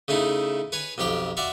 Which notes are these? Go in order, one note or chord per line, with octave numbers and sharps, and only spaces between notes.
C#3 A3 D#4 E4
B4 C#5 G#5
B1 F2 G4 F5 G5
F#4 D5 E5 F5 C6